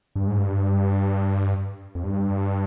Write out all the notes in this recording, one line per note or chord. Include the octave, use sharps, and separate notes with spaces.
G2
G#2
G2
F2
G2